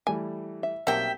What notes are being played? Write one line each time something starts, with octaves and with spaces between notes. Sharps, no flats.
E3 G3 A3 G#5
E5
B1 G3 A#3 C4 E5 F#5 G5